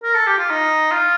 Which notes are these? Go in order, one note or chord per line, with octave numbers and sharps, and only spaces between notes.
A#4
A4
G4
F4
D#4
F4